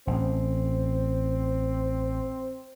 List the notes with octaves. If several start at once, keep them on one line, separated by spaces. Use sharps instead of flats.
A1 C4